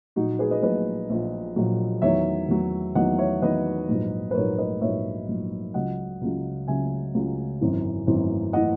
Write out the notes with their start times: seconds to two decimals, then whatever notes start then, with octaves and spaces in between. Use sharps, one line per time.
0.16 A#1 A#2 F#3 D#4 F#4
0.39 G#4 B4
0.51 B4 D#5
0.63 A#1 A#2 F#3 B4 D#5
1.10 A#1 A#2 F#3
1.56 A#1 A#2 F#3
2.02 E2 D#3 F#3 C#5 E5
2.49 E2 D#3 F#3
2.95 E2 D#3 F#3 D#5 F#5
3.18 C#5 E5
3.41 E2 D#3 F#3 B4 D#5
3.89 A#1 G#2 F#3
4.31 B4
4.34 A#1 G#2 F#3 A#4 C#5
4.58 B4 D#5
4.81 A#1 G#2 F#3 C#5 E5
5.28 A#1 G#2 F#3
5.74 C#2 C#3 F#3 D#5 F#5
6.21 C#2 C#3 F#3
6.68 C#2 C#3 F#3 E5 G#5
7.14 C#2 C#3 F#3
7.61 G#1 F#2 E3
8.07 G#1 F#2 E3
8.53 E3 D#5 F#5